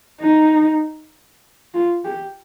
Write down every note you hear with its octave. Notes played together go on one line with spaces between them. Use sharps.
D#4
F4
G4